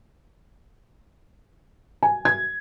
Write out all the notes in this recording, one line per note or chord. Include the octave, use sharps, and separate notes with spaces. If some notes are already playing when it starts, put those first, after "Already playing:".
G#5
G#6